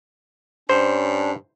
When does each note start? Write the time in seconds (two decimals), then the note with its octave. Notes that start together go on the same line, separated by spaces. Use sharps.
0.69 G2 C#4 D4 C5